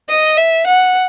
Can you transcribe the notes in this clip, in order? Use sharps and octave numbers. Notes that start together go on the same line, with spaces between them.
D#5
E5
F#5